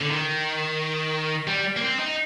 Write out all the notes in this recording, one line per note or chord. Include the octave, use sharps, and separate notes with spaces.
D3
D#3
G3
A#3
C4
D#4